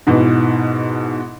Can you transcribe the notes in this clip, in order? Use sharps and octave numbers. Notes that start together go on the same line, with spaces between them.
G#2 B2 E3